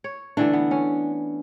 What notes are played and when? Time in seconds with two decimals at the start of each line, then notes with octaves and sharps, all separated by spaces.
0.04 C#5
0.37 D3 E3 A3 D4
0.53 B3
0.71 C#4